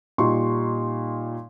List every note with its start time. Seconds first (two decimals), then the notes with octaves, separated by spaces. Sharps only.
0.18 A#2 G3 D#4 C6 C#6